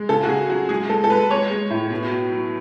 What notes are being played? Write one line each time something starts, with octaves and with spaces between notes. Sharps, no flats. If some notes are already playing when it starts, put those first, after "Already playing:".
Already playing: G#3
C#3 A4
F#4
C#3 G#4
F#3 F#4
G#3 G#4
G#3 A4
A4
G#3 B4
G#3 C#5
G#3
A2
B2
B2
F#3